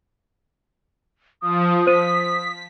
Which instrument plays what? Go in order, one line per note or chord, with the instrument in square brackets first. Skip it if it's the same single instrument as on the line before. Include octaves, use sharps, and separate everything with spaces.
[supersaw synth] F3 [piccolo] D#6
[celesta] C5 D#7 [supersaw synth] B6